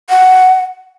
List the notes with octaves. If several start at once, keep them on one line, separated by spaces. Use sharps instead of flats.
F#5